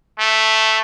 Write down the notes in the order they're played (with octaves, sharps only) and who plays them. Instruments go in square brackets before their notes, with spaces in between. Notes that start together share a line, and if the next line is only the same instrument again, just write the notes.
[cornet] A3